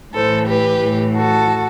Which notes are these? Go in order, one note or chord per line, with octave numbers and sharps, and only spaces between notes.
A2 E3 A4 C5
G4 B4
A2 E3
F#4 A4